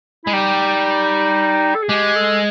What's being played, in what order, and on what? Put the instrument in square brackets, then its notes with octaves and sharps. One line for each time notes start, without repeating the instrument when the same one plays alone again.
[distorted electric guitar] G#3 [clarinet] E4
[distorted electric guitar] G3 [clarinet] D#4
[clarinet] A4
G#4
[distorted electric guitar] G#3 [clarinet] G4
[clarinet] A4